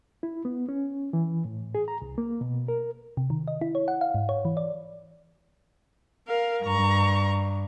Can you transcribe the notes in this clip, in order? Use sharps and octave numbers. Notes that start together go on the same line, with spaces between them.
E4
B3
C#4
E3
A2
G#4
A#5
C2
A#3
B2
A#4
C3
D#3
D#5
E4
C#5
F#5
F5
G#2
C#5
E3
D5
A#4 F5
G2 A#5 C#6